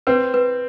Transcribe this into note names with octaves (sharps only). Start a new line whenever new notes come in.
C4 B4
B4